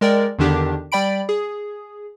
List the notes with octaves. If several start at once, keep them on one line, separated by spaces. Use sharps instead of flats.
G#3 A#4 D5 G5
E2 D3 D#3 D4 G4
G3 D5 G5 B5 D7
G#4